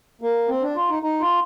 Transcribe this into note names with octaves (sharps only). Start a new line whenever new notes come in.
A#3
C4
D4
F4
D#4
D#4
F4